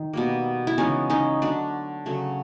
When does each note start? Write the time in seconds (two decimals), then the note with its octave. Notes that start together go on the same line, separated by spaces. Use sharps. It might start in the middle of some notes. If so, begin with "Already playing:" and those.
Already playing: D#3
0.13 B2 G3 A#3
0.67 E4
0.77 C#3 E3 G#3 B3 C#4 D#4
1.10 C#4 D#4
1.42 D3 F#3 A3 D4
2.06 C#3 F#3 A3